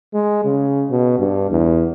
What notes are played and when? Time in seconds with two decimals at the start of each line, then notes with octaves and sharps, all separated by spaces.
0.14 G#3
0.45 C#3
0.90 B2
1.19 G2
1.51 E2